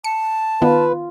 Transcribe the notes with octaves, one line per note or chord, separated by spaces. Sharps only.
A5 C#7
D#3 B3 F4 B4